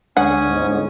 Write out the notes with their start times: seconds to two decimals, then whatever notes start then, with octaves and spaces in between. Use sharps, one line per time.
0.17 D2 G#3 C#4 D4 F#5 G#5 D#6
0.49 G1 G#2